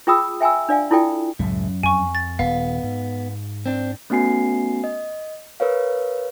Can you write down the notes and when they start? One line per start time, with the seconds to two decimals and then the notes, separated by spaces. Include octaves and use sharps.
0.07 F4 G#4 G5 B5 D#6 E6
0.41 E5 G5 G#5 B5 E6
0.69 D4 D5 F5 G#5
0.91 E4 F4 A4 D5 G5
1.39 C#2 F#2 A2 C#3
1.83 F2 G#5 C#6
2.15 A6
2.39 D#1 B3 F5
2.84 G#2
3.66 C4 D4
4.10 A3 B3 C#4 F#4 G#5 C7
4.84 D#5
5.60 A#4 B4 C#5 F5